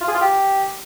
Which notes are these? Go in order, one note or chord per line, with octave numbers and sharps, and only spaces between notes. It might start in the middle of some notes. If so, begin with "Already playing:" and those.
F4
G#4
F4
G4